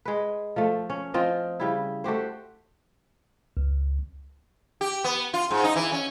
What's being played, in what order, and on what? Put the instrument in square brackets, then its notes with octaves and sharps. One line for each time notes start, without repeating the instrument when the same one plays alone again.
[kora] G#3 B4
F3 A3
C#4
F3 C4 F4 D#5
C#3 G3 E4
A3 F#4 G4 C5
[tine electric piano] C#2
[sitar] G4
B3
F4
G#2
D#4
E3
C#4